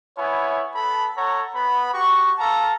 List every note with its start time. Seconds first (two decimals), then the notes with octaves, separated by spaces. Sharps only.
0.17 B3 E4 C#5 G#5
0.74 B3 A4 A5 B5
1.16 A4 C#5 F#5 A#5
1.55 B3 B5
1.94 F#4 G4 C#6
2.38 A4 F5 A5 A#5